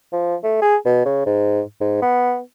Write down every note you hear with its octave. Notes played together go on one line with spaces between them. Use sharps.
F3
A3
G#4
B2
C#3
G#2
G#2
B3